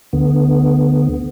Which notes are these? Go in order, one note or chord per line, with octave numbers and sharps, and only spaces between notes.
D2 D3 B3